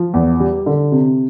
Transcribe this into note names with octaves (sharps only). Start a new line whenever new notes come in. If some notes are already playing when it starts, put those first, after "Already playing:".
Already playing: F3
E2
G3
D3
C3